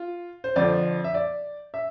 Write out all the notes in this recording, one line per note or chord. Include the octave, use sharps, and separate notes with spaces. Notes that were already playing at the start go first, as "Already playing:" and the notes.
Already playing: F4
C5
F2 D3 F3 D5
E5
D5
E5